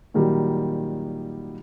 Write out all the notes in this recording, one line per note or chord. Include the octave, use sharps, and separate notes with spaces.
A#2 D#3 F#3 G3